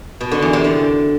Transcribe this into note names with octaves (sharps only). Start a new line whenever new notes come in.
B2
D3
E2
C3
D3